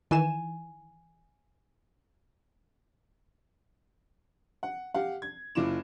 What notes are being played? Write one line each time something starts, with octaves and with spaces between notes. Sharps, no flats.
D#3 E3 G#5 E7
F#5
G4 F5 F#5
G#6
F#1 E4 F4 D6 E7